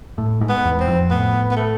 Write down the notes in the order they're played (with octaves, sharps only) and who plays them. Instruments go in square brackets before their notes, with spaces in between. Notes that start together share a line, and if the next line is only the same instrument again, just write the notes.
[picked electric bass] A2
G#2
[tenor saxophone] B3
[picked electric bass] E2
[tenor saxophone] C4
[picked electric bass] F2
[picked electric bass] A2 [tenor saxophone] B3
[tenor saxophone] B3
A3